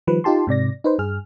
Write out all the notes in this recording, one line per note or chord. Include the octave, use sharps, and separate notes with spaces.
D#3 F3 G3 B4
D#4 F4 G4 A5 C6
G#2 C3 D5 A#6
D#4 B4 C5
G2 G#4 F6